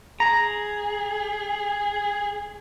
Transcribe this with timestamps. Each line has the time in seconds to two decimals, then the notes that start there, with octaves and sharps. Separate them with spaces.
0.20 G#4 A#5